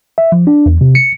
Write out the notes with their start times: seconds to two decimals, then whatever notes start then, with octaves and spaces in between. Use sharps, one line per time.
0.18 E5
0.32 F3
0.47 D4
0.66 E2
0.81 C3
0.95 C#7